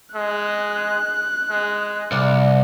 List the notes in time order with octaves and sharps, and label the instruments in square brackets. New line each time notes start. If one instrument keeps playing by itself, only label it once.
[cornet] G#3 [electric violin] F#6
[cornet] G#3
[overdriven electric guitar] C2 [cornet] D5